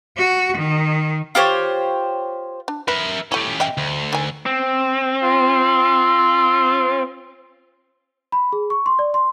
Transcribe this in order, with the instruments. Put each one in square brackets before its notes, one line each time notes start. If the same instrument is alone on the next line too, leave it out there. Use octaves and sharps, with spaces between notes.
[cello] F#4
D#3
[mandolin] F4 G4 C5 C#5
[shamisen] D4
[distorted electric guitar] A#4 E5 [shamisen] B4
[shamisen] A3 E4 [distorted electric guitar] C#4 G4
[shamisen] D#5 E5 G5
[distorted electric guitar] D2
[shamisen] D#3 G#5
[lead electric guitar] C4
[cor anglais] F4
[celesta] B5
G#4
C#6
C6
D5
C6